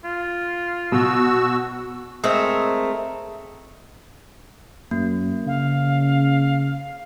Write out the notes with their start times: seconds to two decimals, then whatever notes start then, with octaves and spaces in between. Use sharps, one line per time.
0.04 F4
0.92 B2 F#4 E6
2.24 G#3 A3 C4 A#4
4.91 F#2 A#3
5.47 C#3 F5